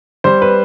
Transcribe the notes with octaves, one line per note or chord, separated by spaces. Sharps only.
G3 C5
B4